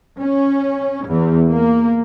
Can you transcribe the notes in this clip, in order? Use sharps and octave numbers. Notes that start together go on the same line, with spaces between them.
C#4
E2
A#3